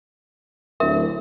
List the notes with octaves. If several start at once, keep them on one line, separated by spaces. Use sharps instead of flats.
D1 A#4 E5